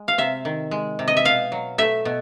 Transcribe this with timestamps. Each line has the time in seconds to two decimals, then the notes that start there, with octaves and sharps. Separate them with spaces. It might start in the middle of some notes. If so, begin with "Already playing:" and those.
Already playing: G#3
0.08 F5
0.18 C3 E5
0.45 D#3
0.71 G#3
0.99 C3
1.08 D#5
1.17 E5
1.25 B2 F5
1.52 F#3
1.78 A3 E5
2.05 B2